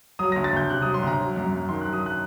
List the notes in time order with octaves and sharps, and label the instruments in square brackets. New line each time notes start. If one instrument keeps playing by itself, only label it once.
[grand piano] F#3 D#6
D2 A#6
A6
D2 G6
C3 F#6
F#3 D#6
C6
D2 A#5
F#3
F#2
F#2
D#3 C6
F#3 F#6
D#6
F#6